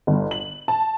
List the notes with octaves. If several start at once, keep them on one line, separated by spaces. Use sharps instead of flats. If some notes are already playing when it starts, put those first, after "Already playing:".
G1
F#7
A5